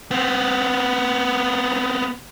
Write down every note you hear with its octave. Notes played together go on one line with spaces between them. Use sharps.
B3 C4